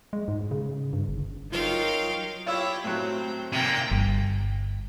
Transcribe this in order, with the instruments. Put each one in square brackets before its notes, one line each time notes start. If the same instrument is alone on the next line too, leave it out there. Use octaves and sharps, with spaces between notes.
[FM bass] G#3
G#2
C#3
G2
G1
[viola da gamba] F#3 D#4 A#4 [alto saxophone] F4 [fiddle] F5 G5
[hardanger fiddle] E4 G4 [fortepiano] F4 C#5 E6
[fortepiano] A2 F#3 [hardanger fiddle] C4
[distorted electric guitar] C3 A#3 [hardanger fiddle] G5
[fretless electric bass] G1